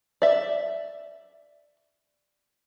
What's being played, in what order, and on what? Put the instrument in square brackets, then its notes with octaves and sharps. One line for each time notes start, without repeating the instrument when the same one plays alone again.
[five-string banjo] D5 E5